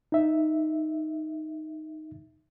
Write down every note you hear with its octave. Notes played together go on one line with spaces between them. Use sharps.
D#4 E5